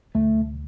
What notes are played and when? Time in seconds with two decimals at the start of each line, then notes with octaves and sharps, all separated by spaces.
0.15 D2 A3